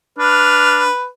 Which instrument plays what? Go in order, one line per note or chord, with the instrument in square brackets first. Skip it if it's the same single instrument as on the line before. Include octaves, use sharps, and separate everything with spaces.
[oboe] D4 [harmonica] B4 [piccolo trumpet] F6